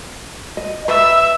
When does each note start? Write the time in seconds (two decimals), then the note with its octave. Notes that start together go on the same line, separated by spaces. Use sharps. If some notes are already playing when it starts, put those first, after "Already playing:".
0.57 D#5
0.88 B4 E5